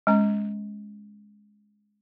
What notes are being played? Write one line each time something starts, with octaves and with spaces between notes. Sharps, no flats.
G#3 C#4 A#5